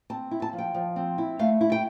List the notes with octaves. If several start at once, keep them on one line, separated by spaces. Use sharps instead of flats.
C4 A5
E4
A5
F3
G5
F3
C4
E4
A3 F5
E4
G5